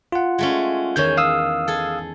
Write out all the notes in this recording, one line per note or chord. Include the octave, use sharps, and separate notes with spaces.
F4 F#5
G#3 A3 C#4
E2 D#3 G#4 C#5 G6
F5 D#6 E6
G#4 A4